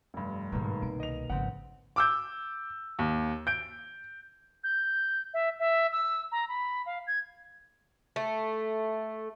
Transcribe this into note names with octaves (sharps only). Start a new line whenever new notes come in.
F1 G2
G#2 B2 D#3 G#3 A#3
C2 D7
D#5 F7
G#1 C#3 F3 C4 F#5
D6 E6 G6
D#2
G6 D7
G6
E5
E5
E6
A#5
B5
F5
G#6
A3